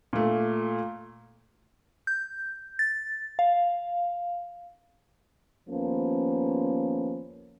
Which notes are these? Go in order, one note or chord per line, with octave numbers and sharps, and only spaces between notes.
A#2 A3
G6
A6
F5
D#2 F3 A#3 B3 C#4